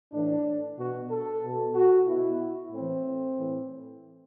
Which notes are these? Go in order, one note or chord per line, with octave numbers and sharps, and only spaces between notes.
A2 E3 D4
B2 F#4
A4
B2
F#4
B2 E4
A2 E3 C4
A2 E3